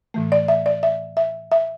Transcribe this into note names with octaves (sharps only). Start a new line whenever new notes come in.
A2 E3 A3
D5
E5
D5
E5
E5
E5